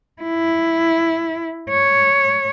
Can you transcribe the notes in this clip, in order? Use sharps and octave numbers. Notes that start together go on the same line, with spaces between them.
E4
C#5